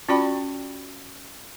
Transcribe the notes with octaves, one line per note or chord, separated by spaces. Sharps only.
C#4 F4 F#4 D5 G5 B5